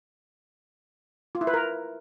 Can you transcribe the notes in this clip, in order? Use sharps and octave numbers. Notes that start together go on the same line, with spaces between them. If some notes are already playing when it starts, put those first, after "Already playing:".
F4
E4
B4
A#4